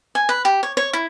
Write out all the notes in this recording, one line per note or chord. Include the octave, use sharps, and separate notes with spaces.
G#5
B4
G4
C#5
C#5
E4